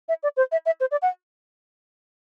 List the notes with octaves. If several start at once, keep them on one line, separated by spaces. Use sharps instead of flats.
E5
D5
C5
E5
E5
C5
D5
F#5